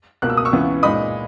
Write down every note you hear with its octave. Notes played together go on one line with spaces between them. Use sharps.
C#2 B2 A#3 F#6
E6
D#6
C#6 E6
C#2 C#3 E3 B3
A#2 G#3 D#4 B5 D#6